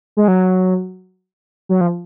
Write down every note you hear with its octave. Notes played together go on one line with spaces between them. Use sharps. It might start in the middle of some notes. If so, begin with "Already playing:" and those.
G#3
F#3
F#3
F3